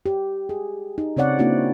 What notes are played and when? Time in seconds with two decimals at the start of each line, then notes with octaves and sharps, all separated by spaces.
0.06 G4
0.49 G#4
0.98 D#4
1.17 C#3 C4 C#5 D5 F#5
1.39 A#3 C4 D4 E4 F#4